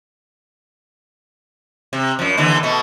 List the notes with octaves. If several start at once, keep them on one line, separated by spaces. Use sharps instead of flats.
C3
F#2 F3
D#2 D3 E3
B2 A3